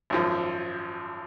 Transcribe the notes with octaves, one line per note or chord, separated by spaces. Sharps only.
G#1 F#2 F3